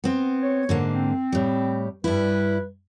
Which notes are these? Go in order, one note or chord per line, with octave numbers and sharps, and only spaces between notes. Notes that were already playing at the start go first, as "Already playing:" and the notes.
B3 C4
C#5
G#2 D3 A#3
C4
A2 G3
G2 G3 E4 B4